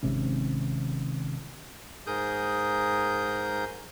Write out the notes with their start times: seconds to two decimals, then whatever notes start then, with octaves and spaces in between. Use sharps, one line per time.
0.03 G#1 G#2 C3 C#4
2.07 G#2 G#4 A#4 D#6 G6